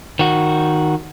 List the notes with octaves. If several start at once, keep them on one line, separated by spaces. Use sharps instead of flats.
D#3 F#4